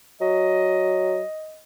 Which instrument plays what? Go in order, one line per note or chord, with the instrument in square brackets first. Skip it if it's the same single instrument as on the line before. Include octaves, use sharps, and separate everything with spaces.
[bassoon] F#3 [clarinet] D#5